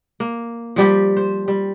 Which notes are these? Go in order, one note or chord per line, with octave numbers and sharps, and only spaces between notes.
A#3
F3 G3 G4
C5
G3